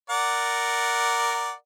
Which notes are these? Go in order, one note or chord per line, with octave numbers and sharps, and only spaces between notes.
A#4 D5 F#5